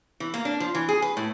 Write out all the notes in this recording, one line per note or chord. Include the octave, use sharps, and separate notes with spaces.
E3
A#3
D4
F3
E3
G#4
B4
A2